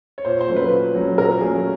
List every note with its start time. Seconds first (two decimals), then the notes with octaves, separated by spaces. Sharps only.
0.18 C#5
0.25 A#2 C5
0.41 C5
0.48 F#3 A3 C#4
0.56 B4
0.71 A#2
0.95 F#3 A3 C#4
1.18 A#2 A#4
1.41 F#3 A3 C#4 G#4